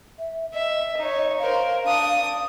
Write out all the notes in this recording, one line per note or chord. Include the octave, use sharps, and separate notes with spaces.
E5
D#5 E5
D#4 C#5
A#4 C5 F5
D4 D#6